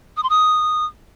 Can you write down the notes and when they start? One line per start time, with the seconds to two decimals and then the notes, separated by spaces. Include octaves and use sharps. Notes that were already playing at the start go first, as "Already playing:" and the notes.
0.17 D#6
0.23 C6
0.29 D#6